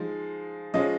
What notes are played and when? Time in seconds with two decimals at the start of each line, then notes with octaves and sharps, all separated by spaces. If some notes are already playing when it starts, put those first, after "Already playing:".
Already playing: F3 G#3 D#4
0.74 F3 G#3 C#4 D#5